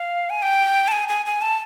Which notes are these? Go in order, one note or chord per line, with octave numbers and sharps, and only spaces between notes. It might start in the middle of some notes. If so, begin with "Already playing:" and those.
Already playing: F5
G#5
G5
A5
G#5
G#5
G#5
A5